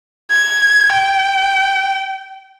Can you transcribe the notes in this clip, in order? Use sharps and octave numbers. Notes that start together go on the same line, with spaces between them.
G#6
G5